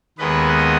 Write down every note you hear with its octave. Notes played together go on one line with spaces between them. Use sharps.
D#2 D#3 G#3 B3 B4 D#5
D#5 F#5